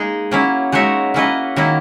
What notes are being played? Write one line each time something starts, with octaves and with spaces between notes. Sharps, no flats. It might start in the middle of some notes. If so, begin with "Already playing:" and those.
Already playing: G#3 A#3 D#4 G#4
F#3 A#3 C#4 E4
G#3 D#4 F#4 C#5 E5
A#3 C#4 E4 B4 D#5
D#3 F#3 A#3 E4